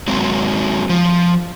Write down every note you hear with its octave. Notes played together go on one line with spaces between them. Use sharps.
F#3 G#3 C4
F3